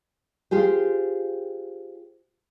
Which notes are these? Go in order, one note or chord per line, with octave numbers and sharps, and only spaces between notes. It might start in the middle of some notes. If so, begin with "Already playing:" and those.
F4 G4 G#4 C5